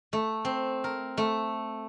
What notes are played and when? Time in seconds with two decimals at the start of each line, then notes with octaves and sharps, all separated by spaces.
0.13 A3
0.45 C4
0.84 A#4
1.17 A3